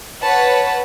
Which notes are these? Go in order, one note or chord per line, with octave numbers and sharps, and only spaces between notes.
B4 C#5 F#5 A5